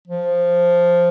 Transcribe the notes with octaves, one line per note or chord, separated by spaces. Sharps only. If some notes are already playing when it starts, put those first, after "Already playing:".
F3